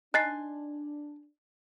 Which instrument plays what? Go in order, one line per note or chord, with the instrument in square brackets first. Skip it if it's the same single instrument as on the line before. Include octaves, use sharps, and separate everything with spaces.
[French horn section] D4 [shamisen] D#4 [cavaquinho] G#5 A5 C6 [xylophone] F#6 A6 C7